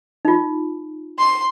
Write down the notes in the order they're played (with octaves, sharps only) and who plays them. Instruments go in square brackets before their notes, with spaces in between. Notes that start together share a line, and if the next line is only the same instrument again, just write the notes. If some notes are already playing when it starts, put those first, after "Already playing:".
[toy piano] D#4 F4
[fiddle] C6